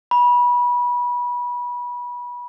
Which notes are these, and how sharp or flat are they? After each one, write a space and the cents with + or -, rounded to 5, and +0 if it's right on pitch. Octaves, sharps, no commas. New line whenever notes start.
B5 -25